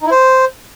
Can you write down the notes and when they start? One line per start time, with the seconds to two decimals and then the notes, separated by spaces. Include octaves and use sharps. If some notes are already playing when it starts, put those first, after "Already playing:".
0.01 D#4
0.06 E4
0.11 C5